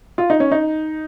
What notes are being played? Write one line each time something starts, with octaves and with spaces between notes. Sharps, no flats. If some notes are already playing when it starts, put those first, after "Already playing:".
F4
D#4
C#4
D#4